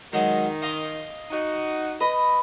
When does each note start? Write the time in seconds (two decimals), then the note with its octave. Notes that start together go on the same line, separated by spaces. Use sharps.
0.13 D#3 F#3 G#3
0.62 D#5 F5 C6
1.31 D#4 F#4
2.01 B4 D#5